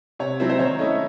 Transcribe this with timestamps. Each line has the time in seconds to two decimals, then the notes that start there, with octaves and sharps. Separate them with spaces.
0.19 C3 C#5
0.40 F#3 C4 E4
0.50 C5
0.59 D#3 C#5
0.79 A3 C#4 E4 D#5